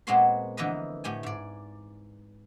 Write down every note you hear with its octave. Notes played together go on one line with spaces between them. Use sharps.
A#2 G#3 B3 C4 F#4 C6
D3 E3 F3 A#3 B4 D#5
A2 A3 G4 G#5
G#2 D5